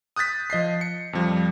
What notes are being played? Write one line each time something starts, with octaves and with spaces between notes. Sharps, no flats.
D#6 F#6 G6 A6 B6
F3 D#5 B6 C7
C#7
F2 F3 G3